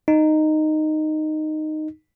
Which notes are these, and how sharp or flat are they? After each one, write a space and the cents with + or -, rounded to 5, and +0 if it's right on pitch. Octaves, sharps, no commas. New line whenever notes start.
D#4 -10